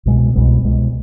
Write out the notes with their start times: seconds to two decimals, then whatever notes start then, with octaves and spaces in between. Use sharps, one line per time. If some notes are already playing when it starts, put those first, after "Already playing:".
0.06 C2 B2 G#3
0.35 C2 B2 G#3
0.64 C2 B2 G#3